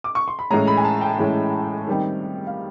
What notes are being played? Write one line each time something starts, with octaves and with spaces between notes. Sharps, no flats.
D6
C#6
C6
B5
A2 E3 G#3 C#4 A#5
B5
G#5
A5
G5
A2 E3 G#3 C#4
D#3 G3 C4 D#4
F5